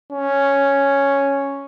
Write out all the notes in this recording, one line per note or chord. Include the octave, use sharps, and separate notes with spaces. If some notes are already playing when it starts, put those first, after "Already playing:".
C#4